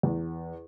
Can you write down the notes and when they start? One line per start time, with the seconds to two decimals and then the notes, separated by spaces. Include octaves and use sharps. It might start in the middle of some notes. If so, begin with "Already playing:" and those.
0.03 E2